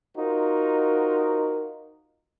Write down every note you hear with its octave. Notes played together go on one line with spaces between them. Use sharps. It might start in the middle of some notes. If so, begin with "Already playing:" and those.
D#4 F4 F#4 A#4 C5